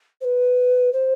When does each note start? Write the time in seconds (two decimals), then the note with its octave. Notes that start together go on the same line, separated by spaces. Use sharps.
0.21 C5
0.24 B4
0.93 C5